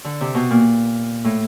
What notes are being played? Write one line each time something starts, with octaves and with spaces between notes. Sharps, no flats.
D3
C3
B2
A#2
A2